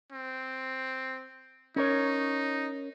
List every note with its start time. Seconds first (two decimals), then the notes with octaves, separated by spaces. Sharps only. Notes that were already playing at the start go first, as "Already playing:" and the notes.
0.12 C4
1.76 C#4 D#4 A#4 C#5